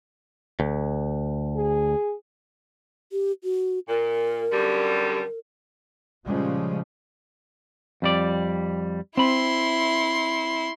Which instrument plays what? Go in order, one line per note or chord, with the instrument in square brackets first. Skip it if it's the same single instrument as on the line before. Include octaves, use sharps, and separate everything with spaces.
[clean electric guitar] D2
[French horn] G#4
[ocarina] G4
F#4
[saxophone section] A#2 [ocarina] A#4
[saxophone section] F#2 D3 G3
[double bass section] A#2 C#3 F3 G3 G#3 C#4
[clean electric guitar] F2 G3 D5
[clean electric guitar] C4 B5 [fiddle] E4 C6